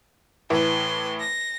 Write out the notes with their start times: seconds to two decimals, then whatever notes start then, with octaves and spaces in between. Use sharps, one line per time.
0.50 A2 E3 B4 C6
1.20 A#6